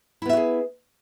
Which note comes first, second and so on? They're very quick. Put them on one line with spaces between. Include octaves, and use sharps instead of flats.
E4 B3 E5 F#4 G#4